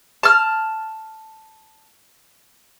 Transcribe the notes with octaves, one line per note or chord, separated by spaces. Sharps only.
A5 F6